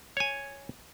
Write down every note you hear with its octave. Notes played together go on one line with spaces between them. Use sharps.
C#5 G#5